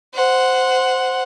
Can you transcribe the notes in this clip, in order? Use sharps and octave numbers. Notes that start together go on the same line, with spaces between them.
C5 F#5